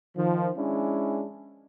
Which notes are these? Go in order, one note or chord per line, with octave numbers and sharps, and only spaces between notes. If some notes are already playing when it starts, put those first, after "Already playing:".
D#3 F3
G#3 C#4 D4 E4